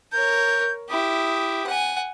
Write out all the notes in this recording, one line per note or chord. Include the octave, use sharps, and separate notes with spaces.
A#4 C#5 G6
E4 G4 D#6
F#5 G#5